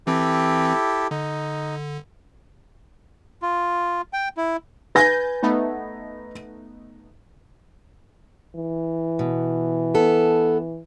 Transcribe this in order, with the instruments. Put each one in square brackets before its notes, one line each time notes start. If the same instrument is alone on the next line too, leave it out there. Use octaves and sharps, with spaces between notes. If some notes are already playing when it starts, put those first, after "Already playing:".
[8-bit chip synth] E3 C4 [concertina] E4 G4 A4
[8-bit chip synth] D3 [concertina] D#4
[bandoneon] F4
G5
E4
[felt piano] B4 A#6 [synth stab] G#5 G6 A6
[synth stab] A3 B3 D#4
[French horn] E3
[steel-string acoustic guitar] B2
B3 A4